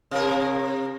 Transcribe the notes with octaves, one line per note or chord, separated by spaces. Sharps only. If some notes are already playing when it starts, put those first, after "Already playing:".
C3 A#4